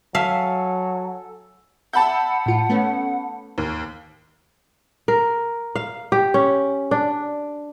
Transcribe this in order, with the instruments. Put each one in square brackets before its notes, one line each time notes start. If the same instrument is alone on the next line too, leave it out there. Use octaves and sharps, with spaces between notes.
[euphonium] F#3 [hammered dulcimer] A4 G#5 [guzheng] E5 F5
[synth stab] E5 E6 [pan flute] F#5 [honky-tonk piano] A5 B5 G6
[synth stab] A2 F4
A3 B3 C#4
[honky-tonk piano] D#2
[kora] A#4
F5
G4
C#4
D4